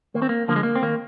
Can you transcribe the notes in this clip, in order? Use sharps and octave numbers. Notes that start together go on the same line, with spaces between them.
D#2 A#3
C4
A#3
D3 F3 A#3
G#3
A#3
C4
D#2 A#3